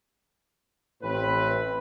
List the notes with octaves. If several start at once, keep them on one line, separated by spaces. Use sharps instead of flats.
A1 A2 C4 B4